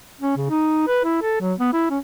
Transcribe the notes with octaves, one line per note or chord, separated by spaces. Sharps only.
C#4
C#3
D#4
B4
E4
A4
F#3
B3
E4
C#4